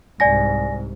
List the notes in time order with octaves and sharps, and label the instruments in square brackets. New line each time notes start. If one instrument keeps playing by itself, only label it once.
[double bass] C2 G#2 [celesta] D5 G#5 A#6